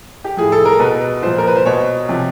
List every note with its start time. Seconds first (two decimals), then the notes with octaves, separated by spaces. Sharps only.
0.24 G4
0.37 A2 F3 G#4
0.52 A4
0.65 A#4
0.79 B2 B4
1.23 A#2 F3 C5
1.38 A#4
1.47 B4
1.56 C5
1.66 B2 C#5
2.09 C3 F3